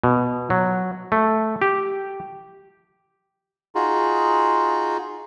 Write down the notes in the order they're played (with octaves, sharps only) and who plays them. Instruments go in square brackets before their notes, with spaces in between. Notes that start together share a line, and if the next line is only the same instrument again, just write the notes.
[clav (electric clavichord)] B2
F#3
A3
G4
[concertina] D#4 F4 F#4 G#4